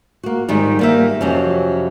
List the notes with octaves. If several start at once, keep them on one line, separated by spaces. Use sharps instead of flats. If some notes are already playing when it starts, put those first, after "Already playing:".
A#3 F#4
G#2 D#3 G3 D#4
G3 A#3 E5
F2 C3 F#3 C#4